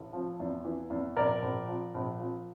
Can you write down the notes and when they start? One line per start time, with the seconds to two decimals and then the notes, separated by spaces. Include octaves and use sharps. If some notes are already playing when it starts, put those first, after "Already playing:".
Already playing: A1
0.13 F3
0.40 E2
0.65 E3
0.90 E2
1.16 A#1 A#4 D5
1.42 A#1
1.68 F3
1.94 A#1
2.20 F3